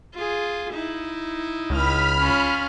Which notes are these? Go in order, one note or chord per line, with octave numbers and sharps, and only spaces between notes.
F4 G#4
D#4 E4
C#2 B5 F6
C#4 F4